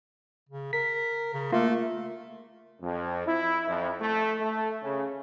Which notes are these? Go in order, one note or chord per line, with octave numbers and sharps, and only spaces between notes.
C#3
A#4 B6
C#3
A3 A#3 F4
F2
E4
F2
A3
A3
C#3